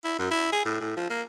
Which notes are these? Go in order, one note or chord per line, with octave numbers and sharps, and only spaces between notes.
E4
F#2
E4
G#4
A2
A2
F3
A#3